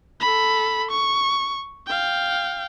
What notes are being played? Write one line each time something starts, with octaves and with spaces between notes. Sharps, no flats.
A4 B5
C#6
F5 G5